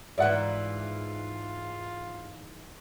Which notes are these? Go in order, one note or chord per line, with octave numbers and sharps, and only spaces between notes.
G#2 E3 F4 D5 E5 F#5